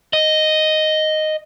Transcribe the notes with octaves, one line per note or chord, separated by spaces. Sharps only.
D#5